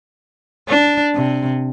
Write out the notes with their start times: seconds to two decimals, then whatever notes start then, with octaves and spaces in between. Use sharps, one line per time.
0.69 D4
1.15 C3